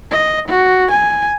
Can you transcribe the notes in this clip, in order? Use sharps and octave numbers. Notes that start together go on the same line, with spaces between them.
D#5
F#4
G#5